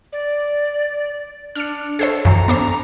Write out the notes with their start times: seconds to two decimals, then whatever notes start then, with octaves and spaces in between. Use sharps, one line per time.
0.13 D5
1.55 D4 F6 C#7
1.99 G#4 A4 C5 C#5
2.25 F#2 E3 A#5
2.48 B3 D4 C5